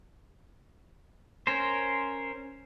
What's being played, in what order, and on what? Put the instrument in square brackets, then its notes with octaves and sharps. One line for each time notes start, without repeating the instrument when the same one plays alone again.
[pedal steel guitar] C#4 A#4 C5